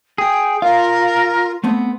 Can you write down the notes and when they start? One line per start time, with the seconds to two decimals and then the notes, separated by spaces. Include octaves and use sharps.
0.18 G#4 G5
0.62 F4 A#4 F5
1.64 A3 B3 C4